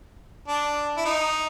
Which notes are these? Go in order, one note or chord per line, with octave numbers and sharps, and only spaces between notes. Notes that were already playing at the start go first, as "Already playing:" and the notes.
D4
E4
D#4